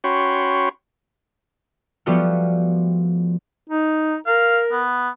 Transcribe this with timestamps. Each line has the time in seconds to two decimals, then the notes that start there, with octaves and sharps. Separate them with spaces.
0.04 C#4 F#4 C#5 G5 B5 C6
2.06 F3 G3 A3 B3 F4 F#4
3.69 D#4
4.26 A#4 F5
4.72 B3